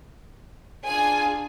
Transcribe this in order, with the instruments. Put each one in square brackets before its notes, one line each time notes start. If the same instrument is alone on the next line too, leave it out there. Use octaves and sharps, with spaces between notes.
[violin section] D4 F4 G#4 G#5